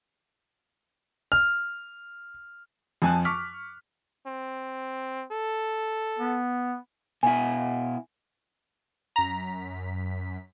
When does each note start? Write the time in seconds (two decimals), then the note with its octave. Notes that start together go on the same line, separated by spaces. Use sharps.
1.32 F6
3.02 F2 F3 G#5 A5 F#6
3.25 C#6 D6 F6 B6
4.27 C4
5.31 A4
6.19 B3
7.23 B2 E4 G#5
9.16 F#2 A#5 B6